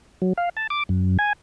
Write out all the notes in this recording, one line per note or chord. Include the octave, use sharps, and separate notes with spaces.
F#3
F5
A5
D6
F#2
G#5